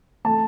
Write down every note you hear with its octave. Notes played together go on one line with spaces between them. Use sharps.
A3 A5